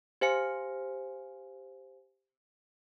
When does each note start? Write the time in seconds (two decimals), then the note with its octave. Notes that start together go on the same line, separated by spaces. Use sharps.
0.21 G4 C5 F5 G#5 C#7